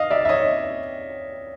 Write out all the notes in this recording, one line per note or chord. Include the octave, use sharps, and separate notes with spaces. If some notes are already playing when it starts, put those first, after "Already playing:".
Already playing: D#5 F5
D5 E5
E5
C#5 D#5